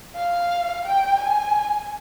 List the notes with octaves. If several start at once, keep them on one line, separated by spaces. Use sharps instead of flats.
F5
G5
G#5